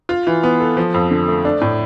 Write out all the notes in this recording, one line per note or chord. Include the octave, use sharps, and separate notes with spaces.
F4
E3
B3
A4
F3
F2
D3
A3
D4
A2